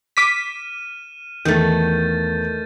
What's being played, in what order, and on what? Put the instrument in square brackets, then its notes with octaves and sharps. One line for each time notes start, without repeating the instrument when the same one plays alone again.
[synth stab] D6 B6 [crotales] F6 D#7 E7
[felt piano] E2 [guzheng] D#3 A3 [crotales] G6 A6